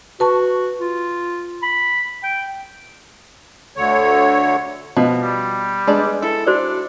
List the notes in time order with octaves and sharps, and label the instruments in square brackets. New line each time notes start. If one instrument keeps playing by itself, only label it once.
[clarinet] F#4 [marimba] B4 A5 C#6
[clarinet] F4
B5
G5
[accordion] D2 D3 C#5
[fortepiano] B2 F3 [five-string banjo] F4 F#4
[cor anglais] G3
[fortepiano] G#3 [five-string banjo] B3 D4 D5
[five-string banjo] E4 [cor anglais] A4
[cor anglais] D4 [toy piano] F#4 C5 D5